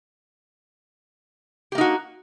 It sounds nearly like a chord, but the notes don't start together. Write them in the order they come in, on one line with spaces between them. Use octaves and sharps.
G4 A#3 D#4 F#4